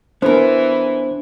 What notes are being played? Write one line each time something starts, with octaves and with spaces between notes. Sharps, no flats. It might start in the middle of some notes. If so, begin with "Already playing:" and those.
E3 B3 D4 A#4 C5